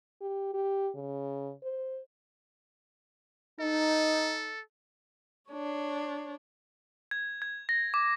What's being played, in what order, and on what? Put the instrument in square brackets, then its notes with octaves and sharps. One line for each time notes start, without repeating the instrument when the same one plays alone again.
[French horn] G4
G4
C#3
C5
[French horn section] D#4 [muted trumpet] A4
[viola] D4 C#5
[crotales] G#6
G#6
A#6
D6